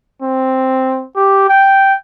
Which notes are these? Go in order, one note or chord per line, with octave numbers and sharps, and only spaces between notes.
C4
G4
G5